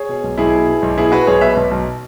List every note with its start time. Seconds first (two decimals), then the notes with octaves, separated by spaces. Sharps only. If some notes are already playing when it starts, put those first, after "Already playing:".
Already playing: G#4 C#5
0.09 B2
0.24 B1
0.38 B1 E4 G#4
0.53 B2
0.68 B2
0.82 B1
0.97 B2 E4 G#4
1.12 B2 F#4 B4
1.27 B1 G#4 C#5
1.41 B2 B4 E5
1.57 B1
1.71 B1